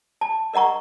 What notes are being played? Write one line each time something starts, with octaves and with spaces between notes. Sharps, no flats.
A5
A#4 D#5 F#5 A#5 C#6